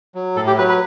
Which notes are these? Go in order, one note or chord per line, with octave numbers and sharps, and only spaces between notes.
F#3
A2 A4
G4
F#3 B4
B4